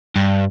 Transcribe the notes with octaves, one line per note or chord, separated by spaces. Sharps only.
G2